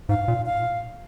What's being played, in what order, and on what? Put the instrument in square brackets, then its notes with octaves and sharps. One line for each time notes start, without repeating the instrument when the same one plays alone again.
[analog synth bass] G#2 [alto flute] F5
[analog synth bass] A#2
[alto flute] F5